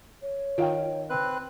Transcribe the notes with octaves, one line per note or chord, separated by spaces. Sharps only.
C#5
D#3 F4 F5 G5
C4 B4 F#6